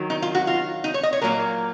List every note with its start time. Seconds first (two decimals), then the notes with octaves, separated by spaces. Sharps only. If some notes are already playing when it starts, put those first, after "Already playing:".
Already playing: D#3 F#3
0.10 D#4
0.22 F4
0.35 F#4
0.47 F4
0.84 D#4
0.94 C#5
1.03 D#5
1.13 C#5
1.21 A#2 F#3 A#3 A#4